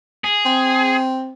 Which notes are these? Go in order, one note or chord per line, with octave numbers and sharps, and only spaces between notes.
G#4
C4